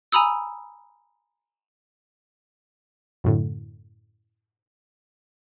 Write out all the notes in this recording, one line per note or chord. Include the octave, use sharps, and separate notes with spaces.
G#5 A#5 B5 D#6 E6
F#2 A2 D3